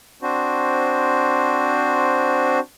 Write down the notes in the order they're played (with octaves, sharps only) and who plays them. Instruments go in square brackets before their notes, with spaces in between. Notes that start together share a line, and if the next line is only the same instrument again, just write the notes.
[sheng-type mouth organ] C4 D4 F#4 C5